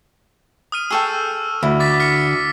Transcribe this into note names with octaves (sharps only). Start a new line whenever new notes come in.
D#6 F6 D#7
G#4 A4 G5 C#6 E6
D2 E4
D6 A6 B6
F6 B6 C#7